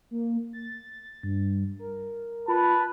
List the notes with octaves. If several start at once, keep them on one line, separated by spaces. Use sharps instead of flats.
A#3
A6
G2
A#4
F4 B4 A5 B5